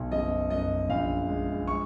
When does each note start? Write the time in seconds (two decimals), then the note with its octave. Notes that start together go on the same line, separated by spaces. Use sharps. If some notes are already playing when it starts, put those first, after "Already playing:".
Already playing: B1
0.12 F#1 D#5
0.50 F#2 D#5
0.89 A#1 F5
1.29 G#3
1.67 C#6